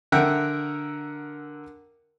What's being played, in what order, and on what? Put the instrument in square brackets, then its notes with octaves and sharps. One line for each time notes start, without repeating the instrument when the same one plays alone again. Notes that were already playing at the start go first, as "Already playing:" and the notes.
[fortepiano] D3 A#4 E5 F#5 G5 F#6